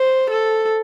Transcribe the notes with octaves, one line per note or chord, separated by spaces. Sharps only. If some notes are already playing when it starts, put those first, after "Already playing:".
Already playing: C5
A4